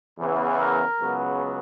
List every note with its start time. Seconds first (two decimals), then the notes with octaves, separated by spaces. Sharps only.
0.17 E2 C#3 E3 B3
0.58 A#4
0.99 C#2 C#3 F#3 B3